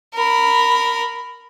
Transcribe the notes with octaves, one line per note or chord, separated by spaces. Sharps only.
A#4 B5